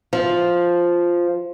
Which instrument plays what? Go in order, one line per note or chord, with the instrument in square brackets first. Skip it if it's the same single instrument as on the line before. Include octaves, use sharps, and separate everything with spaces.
[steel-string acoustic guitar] F3